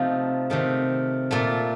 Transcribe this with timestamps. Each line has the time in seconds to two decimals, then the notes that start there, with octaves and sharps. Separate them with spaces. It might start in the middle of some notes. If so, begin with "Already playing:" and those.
Already playing: C3 F3 A3 D#4
0.50 C3 D#3 A3
1.31 A#2 A3